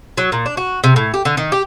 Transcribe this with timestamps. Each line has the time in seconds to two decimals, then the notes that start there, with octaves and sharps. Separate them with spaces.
0.18 F#3
0.32 A#2
0.46 D4
0.57 F#4
0.84 C3
0.96 A2
1.14 G4
1.25 D3
1.37 D#3
1.52 G4